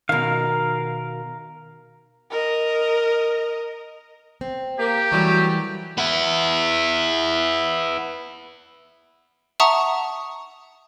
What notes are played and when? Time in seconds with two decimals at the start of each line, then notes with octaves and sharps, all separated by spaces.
0.09 B2 D#3 A#4 F5
2.31 A#4 D#5
4.41 C4
4.79 A#3 G4
5.12 E3 F#3 G3 A3
5.98 B3 E4
9.60 E5 F#5 A5 A#5 C#6 D#6